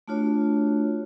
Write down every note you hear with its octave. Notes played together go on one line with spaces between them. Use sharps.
A3 D4 F4 F#4 C#5